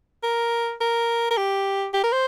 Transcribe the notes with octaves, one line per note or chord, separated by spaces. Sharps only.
A#4
A#4
A#4
G4
G4
A#4
C5